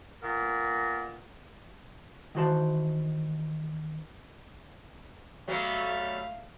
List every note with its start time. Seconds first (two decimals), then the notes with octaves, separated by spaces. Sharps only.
0.22 A#2 B3 A#4
2.35 D#3 E3 F#4 C5 A5
5.48 F#3 G3 A3 B3 F5